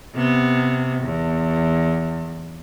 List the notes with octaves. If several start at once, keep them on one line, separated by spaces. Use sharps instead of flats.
C3 B3
E2